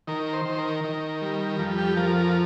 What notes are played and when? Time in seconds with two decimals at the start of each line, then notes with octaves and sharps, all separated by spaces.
0.07 D#3 A#4
0.33 C5
0.45 D#3
0.58 A#4
0.84 D#3
1.22 G3
1.59 F2
1.78 G4
1.97 F3 A#4
2.16 A#4